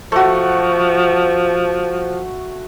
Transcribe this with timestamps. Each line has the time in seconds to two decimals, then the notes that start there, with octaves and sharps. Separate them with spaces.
0.12 F3 A3 F#4